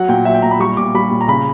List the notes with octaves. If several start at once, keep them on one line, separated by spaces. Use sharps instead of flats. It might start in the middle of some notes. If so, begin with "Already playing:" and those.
Already playing: F#3 F#5
A#2 G5
F#3 E5
G5
A#2 A#5
B5
G3 C#6
A#2 D6
G3 B5
A#2
A#5
C#3 B5